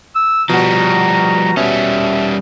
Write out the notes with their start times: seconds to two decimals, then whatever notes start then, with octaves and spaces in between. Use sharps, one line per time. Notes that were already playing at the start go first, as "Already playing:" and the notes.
0.16 E6
0.49 B2 F3 G3 F#4 A#5
1.57 B2 G3 C#4 E5